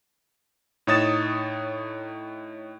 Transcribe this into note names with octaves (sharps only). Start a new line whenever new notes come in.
A2 D#4 C#5 D#6 A6 E7